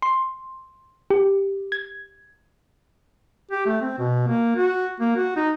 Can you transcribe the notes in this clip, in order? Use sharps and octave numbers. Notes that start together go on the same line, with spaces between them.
C6
G4
G#6
G4
A3
C4
B2
A#3
F#4
A#3
F#4
D#4